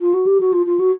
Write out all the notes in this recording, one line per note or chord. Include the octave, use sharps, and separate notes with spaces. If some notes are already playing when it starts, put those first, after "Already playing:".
F4
F#4
G4
F#4
F4
F4
F#4